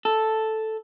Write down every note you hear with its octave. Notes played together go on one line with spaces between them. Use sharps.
A4